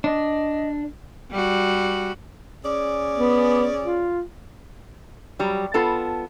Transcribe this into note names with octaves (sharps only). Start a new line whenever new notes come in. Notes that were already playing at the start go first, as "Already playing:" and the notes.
D4 D#5
G3 F#4
C#4 G#4 D5
B3
F4
F#3 G3
B3 F4 A4 A5